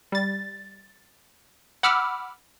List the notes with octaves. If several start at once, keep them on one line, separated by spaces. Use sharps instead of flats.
G3 A6
F#5 B5 D6 E6 F6